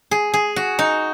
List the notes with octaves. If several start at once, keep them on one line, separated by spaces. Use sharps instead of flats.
G#4
G#4
F#4
D#4